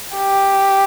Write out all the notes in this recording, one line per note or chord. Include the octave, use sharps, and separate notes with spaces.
G4